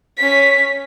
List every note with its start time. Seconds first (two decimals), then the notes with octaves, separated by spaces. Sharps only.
0.18 C#4 B6